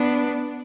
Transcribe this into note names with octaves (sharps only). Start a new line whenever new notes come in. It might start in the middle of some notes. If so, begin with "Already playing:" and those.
Already playing: B3 D4